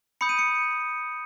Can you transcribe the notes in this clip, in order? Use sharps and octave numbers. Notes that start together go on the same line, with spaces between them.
B5 D#6 G6 C#7
D#7
C#7